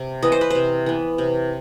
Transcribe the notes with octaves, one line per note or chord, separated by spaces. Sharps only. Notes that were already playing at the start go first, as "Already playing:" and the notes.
Already playing: C3
E3 B3 D#5
C5
B4
C3 C5
E3 B3
C3